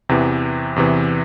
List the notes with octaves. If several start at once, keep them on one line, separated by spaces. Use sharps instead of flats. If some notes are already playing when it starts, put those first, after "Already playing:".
E2 C3 E3
E2 C3 E3